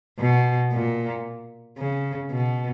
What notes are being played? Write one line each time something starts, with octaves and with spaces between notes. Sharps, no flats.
B2
A#2
C#3
B2